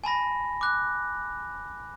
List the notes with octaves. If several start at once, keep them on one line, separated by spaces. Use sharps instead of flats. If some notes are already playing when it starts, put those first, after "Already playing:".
G#5 A5 B5 A#6
D6 F#6